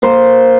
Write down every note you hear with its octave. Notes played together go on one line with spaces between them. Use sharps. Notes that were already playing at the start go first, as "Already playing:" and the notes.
A#3 C5